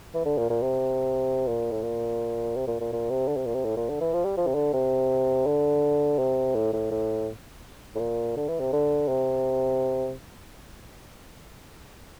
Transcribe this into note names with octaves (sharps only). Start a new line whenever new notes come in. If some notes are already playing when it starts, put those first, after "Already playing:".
E3
D3
A#2
A#2
C3
A#2
A2
A#2
C3
A#2
A#2
A#2
C3
D3
C3
A#2
C3
A2
A#2
D3
E3
F3
G3
F3
C3
D3
C3
D3
C3
A2
A2
A2
A2
A#2
D3
E3
C3
D3
C3